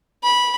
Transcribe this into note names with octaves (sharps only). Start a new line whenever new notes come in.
B5